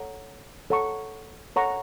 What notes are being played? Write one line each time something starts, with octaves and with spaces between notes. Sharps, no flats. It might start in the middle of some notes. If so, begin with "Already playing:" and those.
Already playing: A4 C#5 F#5 A#5
A4 C#5 F#5 A#5 C#6
A4 C#5 F#5 A#5 C#6